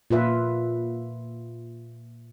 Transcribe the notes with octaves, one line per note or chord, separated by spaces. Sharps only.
A#2 F4 B4 E5